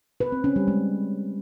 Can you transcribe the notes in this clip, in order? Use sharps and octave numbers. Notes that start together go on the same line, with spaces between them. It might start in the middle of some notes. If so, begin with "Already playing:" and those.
B4
C4
C#4
G3
G#3